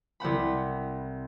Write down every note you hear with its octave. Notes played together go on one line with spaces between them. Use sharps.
C2 C4 F#5 B5